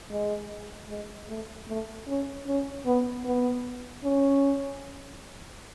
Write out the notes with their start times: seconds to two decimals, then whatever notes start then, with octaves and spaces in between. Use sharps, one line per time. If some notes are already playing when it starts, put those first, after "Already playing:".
0.10 G#3
0.89 G#3
1.28 A3
1.68 A3
2.07 C#4
2.46 C#4
2.86 B3
3.25 B3
4.04 C#4